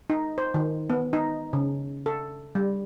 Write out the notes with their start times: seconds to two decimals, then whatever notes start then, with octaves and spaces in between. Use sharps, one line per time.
0.10 D#4
0.38 C5
0.54 D#3
0.90 B3
1.13 D#4
1.53 C#3
2.06 A4
2.55 G3